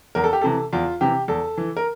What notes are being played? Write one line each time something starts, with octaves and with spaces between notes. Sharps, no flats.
E2 A#4
A4
G4
C3 E3 A4
E2 F4
C3 E3 G4
E2 A4
E3
A#4